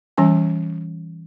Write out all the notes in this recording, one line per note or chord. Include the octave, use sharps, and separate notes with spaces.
E3 G3 C#4 G#5